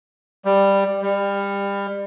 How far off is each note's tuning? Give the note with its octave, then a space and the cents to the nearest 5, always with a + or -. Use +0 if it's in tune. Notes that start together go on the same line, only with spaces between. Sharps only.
G3 +10
G3 +25